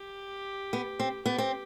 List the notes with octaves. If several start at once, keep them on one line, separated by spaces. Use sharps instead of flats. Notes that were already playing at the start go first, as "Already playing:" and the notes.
Already playing: G4
B3
C4
B3 G4
C4